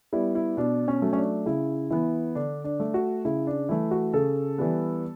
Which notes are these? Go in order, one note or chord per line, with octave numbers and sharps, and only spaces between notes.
G3 B3 E4
E4
B2 D4
C#4
F#3 A3
C#4
D4
C#3 E4
E3 B3 E4
D3 D4
D4
A3
F#4
C#3 E4
D4
E3 A3 E4
F#4
C#3 A4
E3 G3 B3